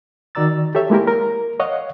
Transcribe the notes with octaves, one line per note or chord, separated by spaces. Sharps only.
D#3 F#4 D5 A#5 E6 A6
G4 A4 C#5 E5
G#3 A#3 E4 G4 A#4
A#4
C#5 D#5 F5 F#5